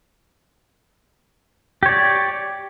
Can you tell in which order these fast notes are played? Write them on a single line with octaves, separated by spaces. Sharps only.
G4 C#5 D5